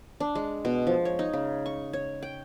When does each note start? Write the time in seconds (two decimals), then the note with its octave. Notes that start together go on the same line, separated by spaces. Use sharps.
0.20 D4
0.35 G#3
0.65 B2
0.87 F3
1.05 C#5
1.19 D#4
1.33 C#3
1.66 C#6
1.93 C#5
2.22 G5